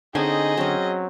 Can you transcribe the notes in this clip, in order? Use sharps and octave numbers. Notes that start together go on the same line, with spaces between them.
D3 C4 C#4 D#4 G#4 D#5 G#5
F#3 C4 C#4